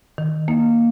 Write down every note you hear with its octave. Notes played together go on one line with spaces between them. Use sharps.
D#3
A#3 D#4